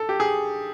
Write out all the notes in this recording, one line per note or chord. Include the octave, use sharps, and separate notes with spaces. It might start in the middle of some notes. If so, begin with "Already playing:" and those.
Already playing: A4
G4
G#4